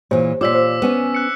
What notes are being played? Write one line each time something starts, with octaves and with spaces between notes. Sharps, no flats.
A#2 E3 G4 C5 C#5
A#2 F4 G4 C#5 D5 D6 E6 B6
C5
B3 C#4 G#5
F#6 C#7